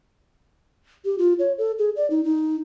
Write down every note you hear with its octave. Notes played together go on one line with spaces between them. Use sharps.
G4
F4
C#5
A4
G#4
D5
D#4
D#4